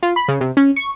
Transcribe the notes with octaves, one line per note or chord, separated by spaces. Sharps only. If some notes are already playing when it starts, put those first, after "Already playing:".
F4
B5
C#3
C3
C#4
C#6